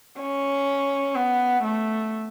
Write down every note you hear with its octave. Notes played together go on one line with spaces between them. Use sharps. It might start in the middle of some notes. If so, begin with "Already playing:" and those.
C#4
B3
A3